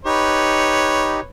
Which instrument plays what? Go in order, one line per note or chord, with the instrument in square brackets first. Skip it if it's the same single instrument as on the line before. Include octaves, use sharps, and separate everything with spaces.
[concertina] D#4 G4 [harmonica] B4 C#5